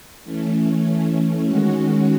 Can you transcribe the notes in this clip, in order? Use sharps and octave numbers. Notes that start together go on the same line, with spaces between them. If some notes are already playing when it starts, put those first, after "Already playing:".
E3 A3 C#4
D#3 G#3 C#4 F#4